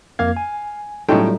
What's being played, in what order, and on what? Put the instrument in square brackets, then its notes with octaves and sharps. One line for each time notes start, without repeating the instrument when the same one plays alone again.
[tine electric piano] F2 A#3 G#6 [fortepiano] F5
[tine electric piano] G#5
[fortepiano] A2 C#4 G5 [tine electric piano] F#3 G3 F4 [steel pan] D#4 A4